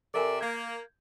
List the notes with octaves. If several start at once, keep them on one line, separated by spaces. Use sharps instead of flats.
C3 A4 A#4 D5 E5 G#5
A#3 G6 G#6